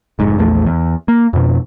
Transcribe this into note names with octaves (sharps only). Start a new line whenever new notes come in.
F1 G#2
A#1 E2 A3
E2
A#3
F2 B2